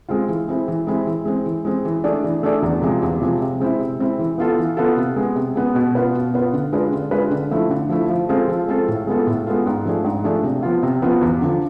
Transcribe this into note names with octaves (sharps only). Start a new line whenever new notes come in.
G#3 C4 F4
E3
G#3 C4 E4
E3
G#3 C4 E4
E3
G#3 C4
E3
G#3 C4
E3
A3 D4 G#4 D5
E3
A3 D4 G#4 D5
E2
C3 F3 G#3
E2
C3 F3 G#3
C3
G#3 C4 E4
C3
G#3 C4 E4
E3
B3 F4 A4
E3
B3 F4 A4
C3
G#3 B3
C3
G#3 B3
B2
B3 F4 B4
B2
B3 F4 B4
D3
G#3 D4 F4 B4
D3
G#3 D4 F4 B4
D3
F3 A3 E4
D3
F3 A3 E4
F3
G#3 C4 F4 A4
F3
G#3 C4 F4 A4
A2
G#3 B3 F4 A4
A2
G#3 B3 F4 A4
G#2
F3 A3 D4 G#4
G#2
F3 A3 D4 G#4
C3
F3 B3 F4
C3
F3 B3 F4
E2
D3 F3